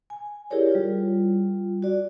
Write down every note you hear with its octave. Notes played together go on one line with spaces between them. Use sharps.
G#5
E4 G4 G#4 A#4 C#5 D5
G3 F4
F#4 D5